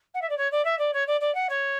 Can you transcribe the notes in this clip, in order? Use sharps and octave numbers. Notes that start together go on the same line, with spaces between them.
F#5
E5
D5
C#5
D5
E5
D5
C#5
D5
D5
F#5
C#5